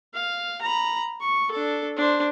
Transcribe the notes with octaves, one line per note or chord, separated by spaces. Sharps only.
F5
A#5 B5
C#6
D4 A4
D4 C5